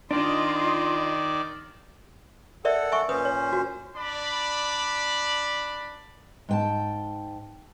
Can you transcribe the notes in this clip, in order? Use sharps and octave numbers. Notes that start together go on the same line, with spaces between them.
D#3 D4 F4 D5 D#5 C6
A4 A#4 D5 E5 F#5
E5 G#5 C#6
A#2 C#4 B4 C5 D#6
C#5
F#4
D4 D5 B5
G#2 G5 A5